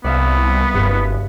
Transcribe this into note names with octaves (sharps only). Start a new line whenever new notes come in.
C2 B3 D5 E5 F5
F#1 G2